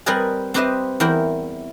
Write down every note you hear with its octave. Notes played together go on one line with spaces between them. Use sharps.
G3 C4 A#4 B4 D#5 G#5
C4 G4 B4 C5 D#5 E5
E2 E4 A#4 G5